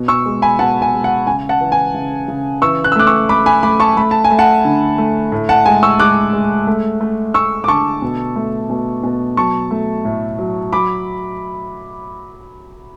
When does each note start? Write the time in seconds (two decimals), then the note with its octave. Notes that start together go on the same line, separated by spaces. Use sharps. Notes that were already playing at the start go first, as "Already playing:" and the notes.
Already playing: B2
0.08 C#6 E6
0.26 G#3
0.42 G#5 B5
0.59 B2 F#5 A5
0.82 G#5
0.93 G#3
1.04 F#5
1.27 C#3 G#5
1.49 F#5 A5
1.61 E3
1.72 G#5
1.94 C#3
2.28 C#3
2.62 E3 C#6 E6
2.84 F#6
2.92 E6
2.96 A3 D6 F#6
3.07 C#6 E6
3.29 A3 B5 D6
3.46 G#5 B5
3.63 A3 B5 D6
3.80 A5 C#6
3.97 A3 B5
4.11 A5
4.24 G#5
4.30 A3
4.39 F#5 A5
4.65 D3
4.98 A3
5.32 A2
5.49 F#5 A5
5.66 G#3 G#5
5.83 C#6 E6
5.99 G#3 D6 F#6
6.33 G#3
6.67 A3
7.01 A3
7.34 A3 C#6 E6
7.64 D6
7.68 D3 A5 C#6
8.02 B2
8.36 A3
8.70 B2
9.04 B2
9.37 F#3 A5 C#6
9.71 A3
10.05 A2
10.39 F#3
10.73 F#3 B5 D6